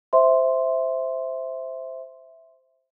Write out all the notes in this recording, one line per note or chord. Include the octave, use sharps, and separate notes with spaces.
C5 E5 C6